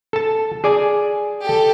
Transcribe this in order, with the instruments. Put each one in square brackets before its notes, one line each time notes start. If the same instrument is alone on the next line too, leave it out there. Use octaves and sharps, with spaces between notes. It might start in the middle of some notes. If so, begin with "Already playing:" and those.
[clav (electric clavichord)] A4 A5
G#4 D5 G#5
[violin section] G4 A4